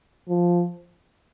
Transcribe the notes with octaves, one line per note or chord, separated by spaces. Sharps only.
F3